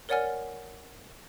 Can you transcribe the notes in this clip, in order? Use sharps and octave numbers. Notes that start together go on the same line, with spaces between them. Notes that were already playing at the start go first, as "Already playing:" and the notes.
A#4 C#5 D5 F#5 G#5 F6